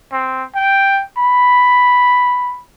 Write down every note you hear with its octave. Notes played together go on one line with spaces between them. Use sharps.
C4
G5
B5